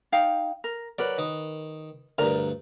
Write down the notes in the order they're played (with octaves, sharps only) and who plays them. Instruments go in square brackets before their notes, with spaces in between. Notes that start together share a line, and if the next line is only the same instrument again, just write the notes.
[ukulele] D#4 F5 G5
A#4
[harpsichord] F#3 D5 [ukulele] A#4 B4
[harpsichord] D#3 D#6
[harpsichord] D2 G2 [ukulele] A#4 D5 A#5